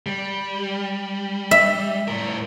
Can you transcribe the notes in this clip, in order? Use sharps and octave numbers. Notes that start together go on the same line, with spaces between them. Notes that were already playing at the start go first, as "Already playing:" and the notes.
G3
E5
A2 A#4